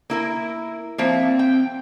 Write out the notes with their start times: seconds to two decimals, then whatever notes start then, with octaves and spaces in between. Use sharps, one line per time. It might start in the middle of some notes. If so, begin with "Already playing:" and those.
0.10 A#3 E4 A#4
0.98 F3 A#3 C4 E5
1.39 G5